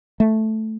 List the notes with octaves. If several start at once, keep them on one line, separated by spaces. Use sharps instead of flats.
A3